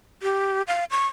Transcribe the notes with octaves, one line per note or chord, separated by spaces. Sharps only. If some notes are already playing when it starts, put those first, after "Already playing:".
G4
F5
C#6